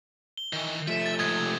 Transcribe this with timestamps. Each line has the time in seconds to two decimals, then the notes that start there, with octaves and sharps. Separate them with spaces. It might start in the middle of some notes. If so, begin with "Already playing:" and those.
0.37 G7
0.53 D#3 E3
0.88 F3 A3 E5
1.06 A6
1.19 G#2 C3 D#6 G#6